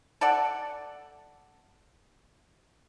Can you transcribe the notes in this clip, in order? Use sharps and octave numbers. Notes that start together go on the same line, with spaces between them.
A4 D5 F#5